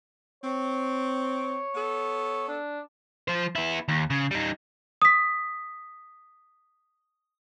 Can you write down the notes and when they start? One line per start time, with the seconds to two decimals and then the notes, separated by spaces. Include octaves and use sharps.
0.44 C4 C#5
1.75 B3 A4
2.48 D4
3.28 F3 C5
3.55 B3 E4
3.88 D#2
4.10 C#3
4.31 G3 D#4
5.02 D#6 B6